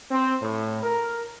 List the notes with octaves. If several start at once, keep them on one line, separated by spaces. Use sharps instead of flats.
C4
A2
A#4